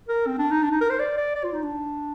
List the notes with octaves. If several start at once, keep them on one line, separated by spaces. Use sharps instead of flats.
A#4
C4
D4
D#4
D4
D#4
A#4
C5
D5
D5
D5
F4
D#4
D4